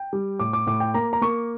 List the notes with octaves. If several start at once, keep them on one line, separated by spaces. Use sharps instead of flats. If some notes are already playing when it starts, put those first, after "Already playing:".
Already playing: G5
G3
A2 D6
D6
A2 D6
G5
A#3 A#5
A#5
A#3 C#6